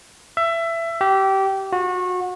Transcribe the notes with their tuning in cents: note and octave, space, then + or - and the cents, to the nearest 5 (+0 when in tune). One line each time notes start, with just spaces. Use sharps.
E5 +20
G4 -20
F#4 -30